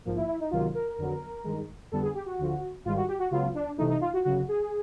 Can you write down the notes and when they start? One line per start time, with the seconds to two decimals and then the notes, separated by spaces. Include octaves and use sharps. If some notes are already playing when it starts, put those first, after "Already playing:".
0.05 A#1 G#2 F3 A#3
0.16 E4
0.28 E4
0.40 D#4
0.51 C#2 C3 D#3 F#3 A#3 F4
0.74 A#4
0.97 F2 D3 F#3 B3
1.44 G2 D#3 G#3
1.91 F2 D3 G3 B3 A4
2.03 G#4
2.15 G4
2.26 F#4
2.38 D2 D3 F3
2.85 G#1 G#2 D#3 G3 F4
2.97 F#4
3.08 G4
3.19 F#4
3.31 C#2 C#3 F#3 B3 F4
3.55 D4
3.78 C2 C3 E3 A3 D#4
3.90 D#4
4.01 F4
4.13 F#4
4.24 G1 F#2 C#3 F#4
4.48 G#4